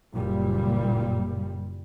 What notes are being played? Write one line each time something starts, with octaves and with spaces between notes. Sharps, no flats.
F#1 A#2 G3